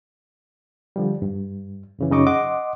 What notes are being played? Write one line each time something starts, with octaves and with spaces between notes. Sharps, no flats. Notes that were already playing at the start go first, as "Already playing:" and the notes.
D3 F3 G3
G2
F#2 C#3 E3
F#2 C#3 D#4 D#5 C#6 D6
D#5 F#5 C6 D6